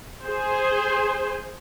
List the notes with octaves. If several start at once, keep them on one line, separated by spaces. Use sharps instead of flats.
G#4 C5